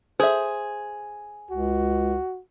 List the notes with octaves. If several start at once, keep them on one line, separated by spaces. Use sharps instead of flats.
G#4 C5 E5
C#2 F#4